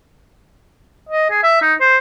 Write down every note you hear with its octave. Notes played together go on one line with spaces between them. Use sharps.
D#5
G#4
E5
D#4
C5